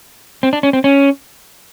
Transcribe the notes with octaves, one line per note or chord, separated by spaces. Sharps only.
C4
D4
C#4
C4
C#4